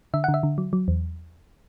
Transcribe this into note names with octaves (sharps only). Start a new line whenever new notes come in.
D3 E5
D3 F#5
E5
D3
F#3
F#3
E2